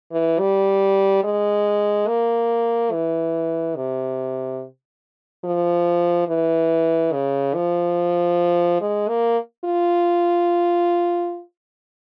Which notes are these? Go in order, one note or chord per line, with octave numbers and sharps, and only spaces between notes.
E3
G3
G#3
A#3
E3
C3
F3
E3
C#3
F3
G#3
A#3
F4